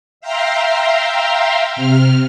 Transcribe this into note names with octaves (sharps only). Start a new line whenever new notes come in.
E5 F5 G5 A#5 C6
C3 F6